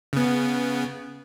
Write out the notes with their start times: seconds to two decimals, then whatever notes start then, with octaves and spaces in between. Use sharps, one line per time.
0.13 C#3 B3